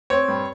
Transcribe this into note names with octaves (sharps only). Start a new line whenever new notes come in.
C4 C#5
G2